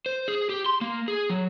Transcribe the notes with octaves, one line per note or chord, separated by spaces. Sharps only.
C5
G#4
G4
C6
A#3
G#4
F#3